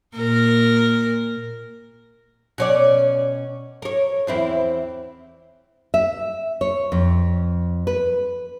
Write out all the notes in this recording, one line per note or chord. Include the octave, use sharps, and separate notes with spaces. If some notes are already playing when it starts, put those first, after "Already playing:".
A#2 A#4
B2 C#4 D5
A#4 C#5
E2 C4 E4
E5
C#5
F2
B4